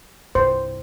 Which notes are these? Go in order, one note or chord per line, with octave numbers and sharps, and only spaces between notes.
C2 G2 C5